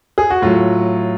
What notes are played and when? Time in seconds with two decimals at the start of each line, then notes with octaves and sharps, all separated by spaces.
0.18 G#4
0.30 F#4
0.42 A2 F#3 F4